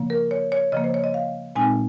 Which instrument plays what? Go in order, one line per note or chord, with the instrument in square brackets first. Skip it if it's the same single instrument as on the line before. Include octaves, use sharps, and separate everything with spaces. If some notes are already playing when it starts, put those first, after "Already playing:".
Already playing: [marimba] C#3 F3 A#3
A#4
C#5
C#5
C#3 F3 A#3 D#5
C5
C#5
D#5
F5
A#2 G#3 C4 D#4 G#5